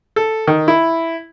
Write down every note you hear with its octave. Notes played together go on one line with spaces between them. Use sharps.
A4
D#3
E4